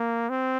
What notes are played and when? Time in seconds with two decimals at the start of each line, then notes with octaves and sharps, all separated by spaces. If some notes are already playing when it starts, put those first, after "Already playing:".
Already playing: A#3
0.29 C4